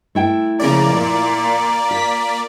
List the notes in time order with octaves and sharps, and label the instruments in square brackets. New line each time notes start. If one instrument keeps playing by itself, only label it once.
[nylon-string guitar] A3 E4 G5
[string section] C#3 F3 A#4 [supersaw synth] A#3 D5 [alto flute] A#5
[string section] A#2
[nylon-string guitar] F4 [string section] B6